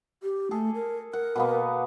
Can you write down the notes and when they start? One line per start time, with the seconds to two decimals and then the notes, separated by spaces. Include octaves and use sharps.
0.23 G4
0.51 A3 G#4 A4
0.75 A#4
1.13 A#4 F#5
1.36 B2 A#3 B3